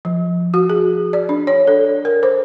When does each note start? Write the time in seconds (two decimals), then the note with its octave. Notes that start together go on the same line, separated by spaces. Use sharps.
0.05 F3
0.54 F#4
0.70 G#4
1.13 D5
1.29 D4
1.47 C#5
1.67 A4
2.05 A#4
2.23 C5